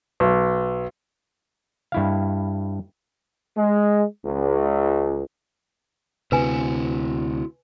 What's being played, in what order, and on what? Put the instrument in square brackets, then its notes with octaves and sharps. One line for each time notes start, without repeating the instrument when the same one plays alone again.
[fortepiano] B1
[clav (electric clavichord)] G2 E4 F5
[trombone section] G#3
C#2
[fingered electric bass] D2 C3 [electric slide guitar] E4 F#4 [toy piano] B4 G#5